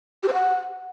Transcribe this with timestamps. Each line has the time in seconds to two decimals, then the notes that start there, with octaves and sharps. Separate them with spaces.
0.23 G4
0.28 C5
0.33 F#5